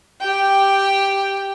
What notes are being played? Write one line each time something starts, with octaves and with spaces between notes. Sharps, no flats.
G4 G5